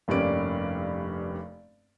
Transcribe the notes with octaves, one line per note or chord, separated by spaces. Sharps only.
F1 G2 A#3 C#4 D5 D7